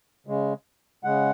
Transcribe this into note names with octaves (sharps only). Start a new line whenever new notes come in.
C#3 G#3
C#3 G#3 F#5